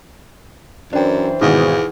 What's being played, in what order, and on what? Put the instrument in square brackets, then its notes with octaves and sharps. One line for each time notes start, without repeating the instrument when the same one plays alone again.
[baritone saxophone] F#2 [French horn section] E3 C5 [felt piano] D4 G5
[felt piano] G#1 B2 [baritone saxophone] E2